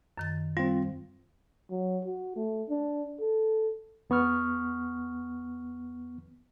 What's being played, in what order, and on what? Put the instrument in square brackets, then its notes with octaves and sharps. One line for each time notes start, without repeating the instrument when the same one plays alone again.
[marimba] F#2 D#3 A6
[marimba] G3 [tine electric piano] C4 F4
[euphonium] F#3
F#4
A3
D4
A4
[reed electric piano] E2 B3 C#6 F6